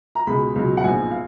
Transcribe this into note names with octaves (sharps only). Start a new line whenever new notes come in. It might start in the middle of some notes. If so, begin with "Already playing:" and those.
A#5
C#2 B2 G#3 B5
C#2 B2 F#3
F#5
A#1 G#2 F3 B3 G#5
F5